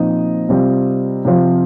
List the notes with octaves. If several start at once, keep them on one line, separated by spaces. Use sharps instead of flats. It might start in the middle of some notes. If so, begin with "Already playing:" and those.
Already playing: A#2 F3 C4 D#4 D#5
C3 G3 C4 F4
C3 F3 C4 F4